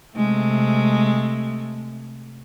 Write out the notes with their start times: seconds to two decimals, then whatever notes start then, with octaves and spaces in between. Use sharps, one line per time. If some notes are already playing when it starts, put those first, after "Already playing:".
0.15 C3 G#3 A3